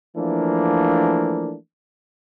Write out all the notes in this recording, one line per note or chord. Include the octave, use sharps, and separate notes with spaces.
E3 F3 A3 A#3 D4